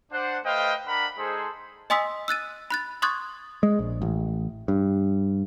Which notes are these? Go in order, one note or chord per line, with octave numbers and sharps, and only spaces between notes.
D4 C5 F#5
A3 B4 C5 D#5 F5 G5
D4 A#4 F#5 B5
G#3 D#4 G#4 A4 C5
D#5 G#5 C6 D#6 E6 B6
E6 F#6 A6 D#7
B5 F#6 A6
C6 C#6 D#6 F#6 G#6 A6
G#3
A#1
A1
G2